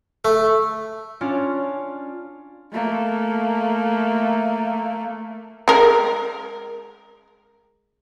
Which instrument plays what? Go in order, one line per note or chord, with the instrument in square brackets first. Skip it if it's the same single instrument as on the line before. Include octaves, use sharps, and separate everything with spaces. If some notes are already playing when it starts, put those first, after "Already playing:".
[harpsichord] A3
[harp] C#4 D4 F4
[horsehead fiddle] A3 A#3
[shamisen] G#3 A#4